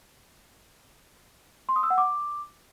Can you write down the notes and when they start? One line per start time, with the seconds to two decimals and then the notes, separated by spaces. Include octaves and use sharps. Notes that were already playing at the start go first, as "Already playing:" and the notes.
1.69 C6
1.76 D#6
1.83 E6
1.90 F#5
1.98 D6